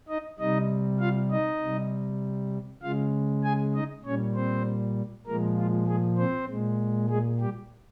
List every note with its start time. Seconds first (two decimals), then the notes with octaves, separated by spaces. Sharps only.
0.08 D#4 D#5
0.39 C3 G3 D#4 D#5
1.00 F4 F5
1.31 D#4 D#5
1.61 C3 G3
2.82 C#3 G#3 F4 F5
3.44 G#4 G#5
3.74 D#4 D#5
4.04 A#2 G3 C#4 C#5
4.35 C4 C5
5.27 A#2 F3 G#3 A#3 A#4
5.57 F4
5.87 G#3 G#4
6.18 C4 C5
6.49 A#2 G#3
7.09 G#3 G#4
7.40 G3 G4